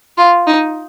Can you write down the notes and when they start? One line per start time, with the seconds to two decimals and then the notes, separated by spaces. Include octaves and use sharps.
0.18 F4
0.47 D#4